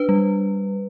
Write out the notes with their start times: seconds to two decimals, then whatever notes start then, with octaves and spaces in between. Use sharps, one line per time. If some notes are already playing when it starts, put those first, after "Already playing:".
Already playing: D4 B4
0.09 G3